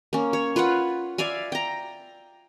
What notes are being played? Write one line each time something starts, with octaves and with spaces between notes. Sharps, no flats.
A#3 C#4
C#5
F4 B4 C#5 F#5
D5 E5 F5 G#5
G5 A#5